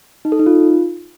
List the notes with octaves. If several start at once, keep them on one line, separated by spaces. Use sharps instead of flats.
D#4
A4
D#4
F4